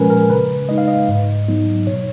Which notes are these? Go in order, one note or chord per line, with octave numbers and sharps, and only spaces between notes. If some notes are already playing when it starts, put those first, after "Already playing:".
Already playing: A#2 F3 G#3 C#4 A#4 B4 G#5
A#4
C#3 B4
G#3 D#4 D#5
F5
D#5
G#2
F#3 B3 D#4
B2 C#5